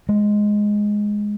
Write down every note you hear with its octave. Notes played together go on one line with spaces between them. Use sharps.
G#3